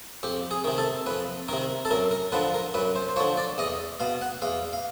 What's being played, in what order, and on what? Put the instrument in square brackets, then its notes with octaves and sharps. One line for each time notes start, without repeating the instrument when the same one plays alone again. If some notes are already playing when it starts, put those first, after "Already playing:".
[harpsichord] F2 G4
G#4
C3 D#3
A4
F2 B4
C3 D#3 A#4
A4
F#2 A#4
A#4
D3 F3 B4
A#4
F#2 B4
C5
C5
F3 C#5
D3
D5
E2 D#5
B2 F5
F#5
E2 F5
F5